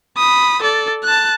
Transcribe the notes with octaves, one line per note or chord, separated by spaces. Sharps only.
B5 D#6
A4 D5
A5 F#6